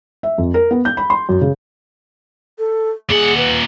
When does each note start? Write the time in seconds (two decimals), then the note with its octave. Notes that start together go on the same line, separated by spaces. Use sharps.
0.23 E5
0.38 F2
0.54 A#4
0.71 B3
0.85 G6
0.97 B5
1.10 C6
1.29 F#2
1.41 C#3
2.59 A4
3.10 A#2 G#4 F#5
3.37 B4